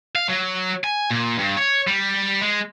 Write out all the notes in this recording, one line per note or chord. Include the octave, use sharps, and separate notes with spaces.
F5
F#3
G#5
A#2
G2
C#5
G3
G#3